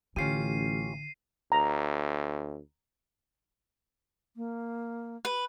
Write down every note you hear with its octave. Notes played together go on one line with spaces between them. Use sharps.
A1 D3 C#4 F4 G4 C7 D#7
D2 A#5
A#3
B4